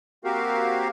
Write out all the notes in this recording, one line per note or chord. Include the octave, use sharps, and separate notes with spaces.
A#3 C4 F#4 G4 A#4 F5